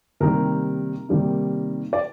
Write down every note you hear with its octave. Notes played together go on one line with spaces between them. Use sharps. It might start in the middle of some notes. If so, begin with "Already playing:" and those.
C3 D#3 G3 A#3 D#4 A#4
C3 D#3 G3 A#3 D#4
D5